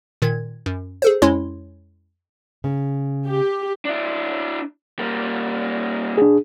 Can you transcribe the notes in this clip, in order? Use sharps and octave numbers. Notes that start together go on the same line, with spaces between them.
A#2 D#3 G#6
F#2
G#4 A4 C5
F2 G#3 C#4 E4 C#5 C6
C#3
G4
D4 E4
G3 A#3
D4 G#4